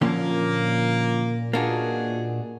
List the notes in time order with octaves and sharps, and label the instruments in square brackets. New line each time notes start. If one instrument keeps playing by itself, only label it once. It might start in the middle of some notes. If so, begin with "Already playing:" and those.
[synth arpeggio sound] A#2 [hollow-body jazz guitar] D3 F3 C#4 [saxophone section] A#3
[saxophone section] F#2 B2 G#4 [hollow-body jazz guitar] A#3 D4 F#4